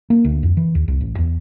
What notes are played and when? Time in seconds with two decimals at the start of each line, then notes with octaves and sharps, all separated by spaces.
0.10 A#3
0.25 D2
0.43 F2
0.57 E3
0.75 D#2
0.88 C2
1.01 A1
1.18 E2